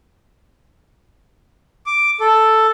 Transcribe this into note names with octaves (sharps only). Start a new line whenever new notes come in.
D6
A4